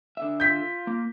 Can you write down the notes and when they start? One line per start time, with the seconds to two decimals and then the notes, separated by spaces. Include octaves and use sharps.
0.17 D3 E5
0.40 F4 G6 B6
0.87 A#3